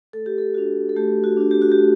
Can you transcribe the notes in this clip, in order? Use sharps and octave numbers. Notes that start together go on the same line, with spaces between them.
A3 A4
G4
A4
D4 F#4
A4
A3 G4
F#4
D4 F#4
G4
F#4
G4
A3